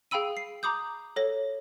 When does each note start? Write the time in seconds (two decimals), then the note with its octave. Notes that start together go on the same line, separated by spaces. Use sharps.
0.11 G#4 F5 G5 B5 E6 D#7
0.37 C7
0.63 A#5 B5 D6 D#6 G6
1.16 A4 C#5 A#6